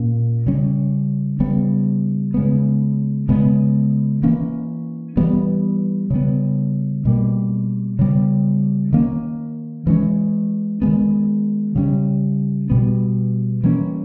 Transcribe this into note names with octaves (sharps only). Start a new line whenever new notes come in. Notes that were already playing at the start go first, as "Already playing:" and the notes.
Already playing: A#2 A#3 C#4
C#3 G3 C#4
C#3 G3 B3
C#3 G#3 B3
C#3 G#3 B3
E3 A#3 C#4
E3 G3 B3
C#3 G3 B3
B2 G3 A#3
C#3 G3 B3
D#3 A#3 C#4
E3 G#3 C#4
D#3 G#3 B3
C#3 G3 C#4
B2 G3 B3
E3 G3 A#3 C#4